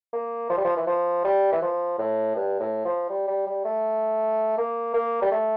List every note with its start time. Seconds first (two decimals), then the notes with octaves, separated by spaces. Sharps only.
0.13 A#3
0.50 F3
0.57 G3
0.65 F3
0.77 E3
0.87 F3
1.25 G3
1.52 E3
1.62 F3
1.99 A2
2.36 G2
2.60 A2
2.85 F3
3.10 G3
3.28 G3
3.46 G3
3.65 A3
4.58 A#3
4.94 A#3
5.22 G3
5.32 A3